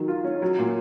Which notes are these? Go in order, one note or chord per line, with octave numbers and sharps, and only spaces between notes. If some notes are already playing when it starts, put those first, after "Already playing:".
Already playing: D#3 F#3
F4
C#4
F#3
A#2